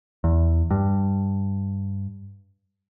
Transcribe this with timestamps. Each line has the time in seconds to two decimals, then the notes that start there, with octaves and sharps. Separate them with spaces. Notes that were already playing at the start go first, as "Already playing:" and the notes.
0.24 E2
0.71 G2